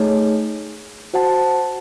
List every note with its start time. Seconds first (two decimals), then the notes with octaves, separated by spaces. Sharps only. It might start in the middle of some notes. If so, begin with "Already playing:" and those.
Already playing: A3 D#4 G#4 C#5
1.14 F#4 C5 F#5 A5